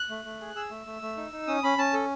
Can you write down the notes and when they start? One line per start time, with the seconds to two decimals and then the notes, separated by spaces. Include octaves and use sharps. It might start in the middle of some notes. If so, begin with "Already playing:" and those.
Already playing: F#6
0.10 A3
0.25 A3
0.41 G#4
0.55 G#4 E6
0.70 A3
0.86 A3
1.02 A3
1.17 D#4
1.32 D#4
1.47 C#4 D#6
1.63 C#4 B5
1.78 C#4 A5
1.94 A4